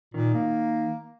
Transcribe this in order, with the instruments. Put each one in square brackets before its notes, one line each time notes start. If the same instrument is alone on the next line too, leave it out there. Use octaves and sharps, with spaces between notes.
[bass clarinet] A#2 [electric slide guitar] D#3
[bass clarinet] A#3